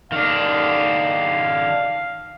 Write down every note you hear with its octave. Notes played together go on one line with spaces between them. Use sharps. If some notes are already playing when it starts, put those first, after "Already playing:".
D#3 D4 F5